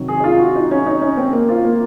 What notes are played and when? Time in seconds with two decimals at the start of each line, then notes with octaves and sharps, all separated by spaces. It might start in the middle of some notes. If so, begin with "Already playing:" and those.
Already playing: C3 D#3 F#3
0.08 G#4
0.20 D#4
0.24 F4
0.39 F#4
0.56 D#4
0.71 C#4
0.86 D#4
1.01 C#4
1.17 C4
1.33 A#3
1.49 F4
1.65 A#3